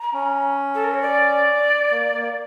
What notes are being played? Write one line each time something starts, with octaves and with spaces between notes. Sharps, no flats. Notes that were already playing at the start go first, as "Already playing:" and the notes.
Already playing: A#5
C#4
A4
A#4
C#5
D5
A#3
A#3